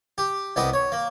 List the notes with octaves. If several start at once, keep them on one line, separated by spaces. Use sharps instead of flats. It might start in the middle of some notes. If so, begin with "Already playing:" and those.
G4
C2 B3 G4 D#5
C#5
A#3